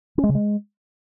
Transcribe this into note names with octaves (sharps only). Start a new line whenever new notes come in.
C#4
G#3
C#3
G#3